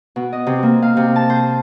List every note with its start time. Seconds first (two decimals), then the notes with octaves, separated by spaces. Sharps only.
0.16 B2
0.33 D#5
0.47 C3
0.63 A#3
0.82 F5
0.97 C3
1.16 A5
1.30 C5